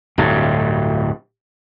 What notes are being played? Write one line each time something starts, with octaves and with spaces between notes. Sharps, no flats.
D1 G2